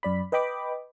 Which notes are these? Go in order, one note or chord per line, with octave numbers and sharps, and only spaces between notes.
F#2 D5 B5
B4 D#5 G5 B5 D6